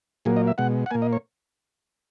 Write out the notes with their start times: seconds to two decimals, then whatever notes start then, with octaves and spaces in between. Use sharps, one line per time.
0.25 A#2 F#3 A#3 G#4
0.37 D#5
0.47 E5
0.58 B2 G#3 F#5
0.86 F#5
0.91 A#2 A#3 G#5
1.02 D#5
1.13 C#5